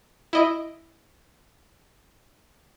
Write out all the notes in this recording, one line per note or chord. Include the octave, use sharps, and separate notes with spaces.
E4 D#5 D7